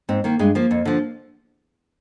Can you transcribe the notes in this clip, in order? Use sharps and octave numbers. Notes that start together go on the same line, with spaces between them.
G#2 C4
D#3 A#3
G2 G#3
F3 A#3
F2
D3 F3